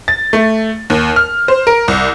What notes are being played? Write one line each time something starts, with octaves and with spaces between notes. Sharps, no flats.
A6
A3
D#2
F6
C5
A#4
C2